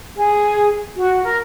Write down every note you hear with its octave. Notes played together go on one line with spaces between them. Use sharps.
G#4
F#4
A#4